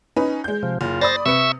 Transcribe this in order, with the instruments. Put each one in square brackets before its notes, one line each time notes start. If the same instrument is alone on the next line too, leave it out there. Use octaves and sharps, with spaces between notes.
[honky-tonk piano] C#4 D#4 B4
G#3 G6
[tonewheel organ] C3 F3
[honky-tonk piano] F#1 [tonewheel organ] F4
[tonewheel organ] C5 A6 A#6 [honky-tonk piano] D5 B5 D#6
[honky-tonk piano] C3 B4 C#7 [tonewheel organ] E5 C#6 E6